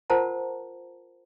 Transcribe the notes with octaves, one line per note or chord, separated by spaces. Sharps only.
F4 A#4 C5 F#5 A5 A#5